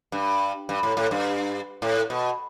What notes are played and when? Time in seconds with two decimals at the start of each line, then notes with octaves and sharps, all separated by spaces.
0.12 G2
0.69 G2
0.83 A2
0.97 A2
1.11 G2
1.82 A2
2.10 B2